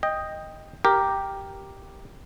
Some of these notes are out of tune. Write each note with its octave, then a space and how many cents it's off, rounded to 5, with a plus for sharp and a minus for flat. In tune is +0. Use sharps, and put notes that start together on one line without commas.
D#5 +0 G5 +15
G4 +0 A#4 +0